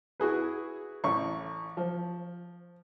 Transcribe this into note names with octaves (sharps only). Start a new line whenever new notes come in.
E4 F#4 G#4 B4
A1 C#6
F3